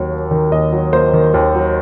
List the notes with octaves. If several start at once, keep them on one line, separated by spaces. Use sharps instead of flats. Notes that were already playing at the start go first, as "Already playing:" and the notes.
Already playing: D#2 F#3
A#3
D#3
D#2 D#5
F#3
A#3 C5
D#3
D#2
F#3